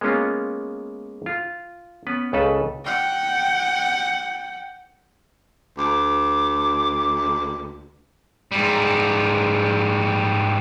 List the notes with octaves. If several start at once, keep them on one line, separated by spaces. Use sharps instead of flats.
G#3 A#3 B3 C#4 F4
F4
B3 C#4 B4
C#2 C#3 A4 B4
F#5 G5
D2 D6
G#2 G3